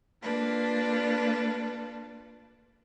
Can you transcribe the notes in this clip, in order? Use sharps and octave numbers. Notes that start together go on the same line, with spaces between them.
A#3 D4 F4 A4 B4